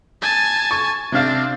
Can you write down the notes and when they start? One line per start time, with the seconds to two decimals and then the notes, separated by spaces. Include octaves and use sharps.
0.22 G#5 A5
0.71 C#6
1.12 C3 C4 D4 F5